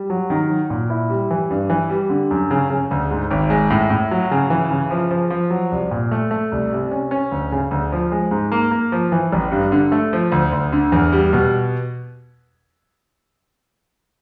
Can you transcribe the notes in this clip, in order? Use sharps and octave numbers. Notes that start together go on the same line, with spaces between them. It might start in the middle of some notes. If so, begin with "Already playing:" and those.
Already playing: G3
F#3
D#3
F#3
A#2
E4
G3
E3
G2
E3
G3
D3
F#2
C#3
C#3
D2
G#2
G#1
G#3
A2
A2
F#3
C#3
E3
C#3
F3
F3
F3
F#3
C2
A#2
A3
A3
C2
C3
C#4
C#4
D2
C#3
D2
F3
G#3
G#2
A#3
A#3
F3
E3
A1
G2
D3
A3
F3
D2
D2
D3
E2
G3
B2